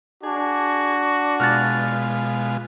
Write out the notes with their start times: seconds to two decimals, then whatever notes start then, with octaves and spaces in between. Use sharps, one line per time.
0.23 D4 F#4 G#4
1.40 B2 G#3 F4 F6 F#6 A6